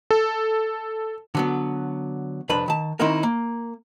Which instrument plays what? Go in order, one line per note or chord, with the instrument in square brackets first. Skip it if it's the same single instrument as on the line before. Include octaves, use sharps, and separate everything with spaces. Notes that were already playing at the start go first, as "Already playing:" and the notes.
[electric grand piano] A4
[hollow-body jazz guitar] D3 F#3 B3
C2 F2 D4 B4 B5
D#3 A5
D#3 C4 C#4 D#4 E4 A#4
A#3